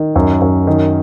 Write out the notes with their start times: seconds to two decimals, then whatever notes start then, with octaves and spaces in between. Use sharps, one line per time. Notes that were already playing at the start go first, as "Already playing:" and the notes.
Already playing: D#3
0.16 F#2
0.42 F#2
0.67 D#3